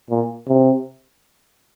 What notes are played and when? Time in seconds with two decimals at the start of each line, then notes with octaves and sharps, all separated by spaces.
0.10 A#2
0.48 C3